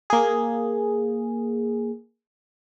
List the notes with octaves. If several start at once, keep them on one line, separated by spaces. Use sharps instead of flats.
A#3 G#4